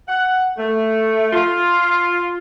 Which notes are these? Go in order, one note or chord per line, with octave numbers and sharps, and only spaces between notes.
F#5
A3
F4